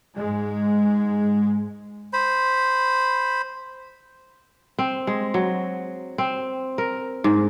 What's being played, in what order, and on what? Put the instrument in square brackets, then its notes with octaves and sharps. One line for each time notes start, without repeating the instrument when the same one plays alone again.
[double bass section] G#2 G#3
[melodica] C5 B5
[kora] C4
G#3
F#3
C4
A#4
G#2